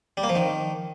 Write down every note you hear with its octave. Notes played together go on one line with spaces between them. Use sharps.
G3
A#3
F3
D#3